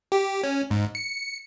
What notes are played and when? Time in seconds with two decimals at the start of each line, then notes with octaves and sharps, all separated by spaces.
0.12 G4
0.44 C#4
0.71 G#2
0.95 C#7